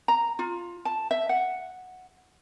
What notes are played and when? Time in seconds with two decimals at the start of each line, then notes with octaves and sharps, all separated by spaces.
0.08 A#5
0.39 F4
0.85 A5
1.11 E5
1.29 F#5